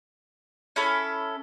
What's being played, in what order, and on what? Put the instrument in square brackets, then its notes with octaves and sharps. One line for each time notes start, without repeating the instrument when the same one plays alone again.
[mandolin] C#4 E4 A4 B5